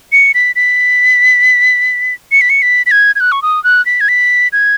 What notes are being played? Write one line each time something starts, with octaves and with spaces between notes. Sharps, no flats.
C#7
B6
B6
C#7
B6
C#7
B6
B6
G#6
G#6
F#6
C#6
D#6
F#6
B6
G#6
B6
G#6